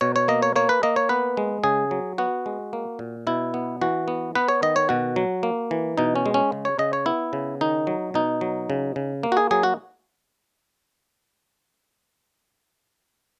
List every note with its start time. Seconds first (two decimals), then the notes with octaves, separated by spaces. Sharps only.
0.01 B2 C#5
0.16 C#5
0.28 A#3 D#5
0.42 C#5
0.56 A#3 C#5
0.69 B4
0.83 A#3 D#5
0.96 C#5
1.09 B3 B4
1.37 G#3
1.64 C#3 G#4
1.91 F#3
2.18 B3 F#4
2.46 G#3
2.73 A#3
2.99 A#2
3.27 B2 E4
3.54 B3
3.81 E3 F#4
4.08 B3
4.35 B3 B4
4.48 C#5
4.62 D#3 D#5
4.76 C#5
4.89 B2 F#4
5.16 F#3
5.43 A#3
5.71 E3
5.98 B2 D#4
6.16 C#4
6.26 G#3
6.34 C#4
6.52 C#3
6.65 C#5
6.79 C#3 D#5
6.93 C#5
7.06 B3 E4
7.33 C#3
7.61 D#3 D#4
7.87 F#3
8.14 B2 D#4
8.41 F#3
8.70 C#3
8.96 C#3
9.23 A#3
9.32 F#4
9.37 G#4
9.51 F#3 G#4
9.63 F#4